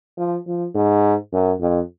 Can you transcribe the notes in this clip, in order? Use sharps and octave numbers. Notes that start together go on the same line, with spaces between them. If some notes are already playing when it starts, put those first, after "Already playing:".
F3
F3
G#2
F#2
F2